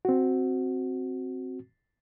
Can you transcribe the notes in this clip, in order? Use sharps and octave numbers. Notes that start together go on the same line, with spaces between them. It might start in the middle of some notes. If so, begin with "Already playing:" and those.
C4 F#4